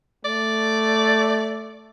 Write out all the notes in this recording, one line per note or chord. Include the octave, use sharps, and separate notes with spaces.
A3 D5